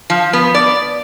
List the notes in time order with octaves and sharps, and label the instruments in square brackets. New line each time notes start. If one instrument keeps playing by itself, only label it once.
[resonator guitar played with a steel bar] F3
B3
D5